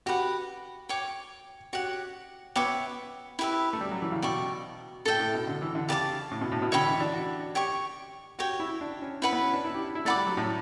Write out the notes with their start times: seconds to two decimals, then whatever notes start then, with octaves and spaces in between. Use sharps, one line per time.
0.06 F#4 G4 B4 F#5
0.89 C#5 G5 D6
1.73 F#4 G4 C#5 F#5
2.56 B3 C#5 E5 G5 D6
3.39 E4 G4 B4 E5
3.73 A3
3.81 G3
3.91 F#3
4.02 E3
4.12 C#3
4.22 B2 D5 G5 C#6
5.05 A2 A4 E5 G5
5.19 A2
5.34 B2
5.47 D3
5.62 E3
5.75 D3
5.89 C#3 G4 D5 A5 D6
6.31 A2
6.41 B2
6.52 A2
6.62 B2
6.72 D3 C#5 E5 G5 B5
6.86 E3
7.00 D4
7.14 F#4
7.55 G4 C#5 G5 C#6
8.39 F#4 G4 C#5 G5
8.60 E4
8.81 D4
9.02 C#4
9.22 C#4 E4 B4 F#5 B5
9.33 B3
9.43 C#4
9.54 D4
9.64 E4
9.74 G4
9.95 E4
10.05 A3 D5 F#5 B5 D6
10.15 G3
10.27 F#3
10.37 A2